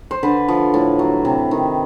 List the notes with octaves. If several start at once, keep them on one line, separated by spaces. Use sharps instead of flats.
C5
D3 B4
F3
A2
F#3
C3
D#3